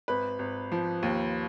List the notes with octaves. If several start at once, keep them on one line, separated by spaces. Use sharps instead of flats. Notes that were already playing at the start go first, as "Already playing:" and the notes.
G#1 B4
G#1
F3
D#2